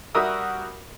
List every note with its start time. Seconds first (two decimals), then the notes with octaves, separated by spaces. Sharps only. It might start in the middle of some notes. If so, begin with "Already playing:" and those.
0.15 G3 F#4 A#4 E5 D#6 E6